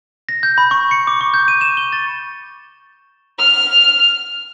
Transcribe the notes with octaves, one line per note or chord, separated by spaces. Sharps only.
A#6
G6
B5
C#6
C#7
D6
C#6
G6
D#7
E7
G7
A6
F6